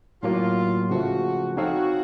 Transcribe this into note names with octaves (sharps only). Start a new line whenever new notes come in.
A2 F#3 A#3 F4
C#3 F3 A3 F#4
C4 D#4 F#4 A4 C#5 F5